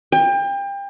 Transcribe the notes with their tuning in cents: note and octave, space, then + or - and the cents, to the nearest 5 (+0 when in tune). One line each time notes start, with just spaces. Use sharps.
G5 +30